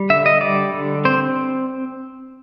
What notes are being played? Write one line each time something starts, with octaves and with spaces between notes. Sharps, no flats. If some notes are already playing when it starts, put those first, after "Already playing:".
Already playing: G3
D3 E5
D#5
G3 D5
D3
C4 C5